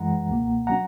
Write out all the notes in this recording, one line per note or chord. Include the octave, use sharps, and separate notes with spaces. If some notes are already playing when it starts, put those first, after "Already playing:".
Already playing: F#2 E3 G#3 F#5 A#5
C#2 B2 A#3
F#3 C#4 F#5 A#5